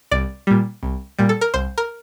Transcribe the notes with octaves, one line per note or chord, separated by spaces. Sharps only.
C2 D5
A#2 G3
C2
A#2 G3
A4
A#4
C2 C5
A#4